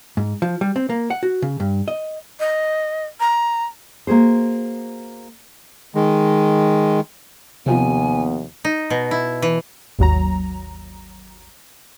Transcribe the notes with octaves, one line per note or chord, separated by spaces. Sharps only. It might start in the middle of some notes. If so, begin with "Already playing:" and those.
G#2
F3
G3
C4
A#3
F#5
F#4
C#3
G2
D#5
D#5
A#5
A#3 F#4 G#4 C5
D#3 G#3
D#2 C3 F3 B3 G#5
D#4
B2
E4
E3
G#1 D#2 F#3 A#5